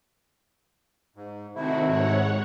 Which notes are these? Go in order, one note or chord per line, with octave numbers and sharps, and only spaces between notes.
G#2
C3 D#3 A3 C4 E4 F#4
G#2 C#5 F#5